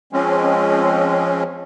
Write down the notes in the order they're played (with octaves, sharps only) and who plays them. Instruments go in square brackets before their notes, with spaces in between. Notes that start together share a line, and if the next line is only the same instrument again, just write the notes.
[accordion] F3 G#3 C4 C#4